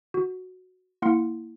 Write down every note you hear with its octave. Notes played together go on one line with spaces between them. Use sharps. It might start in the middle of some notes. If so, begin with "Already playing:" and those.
F#4
A#3 E4 F#5 C6 F6 C#7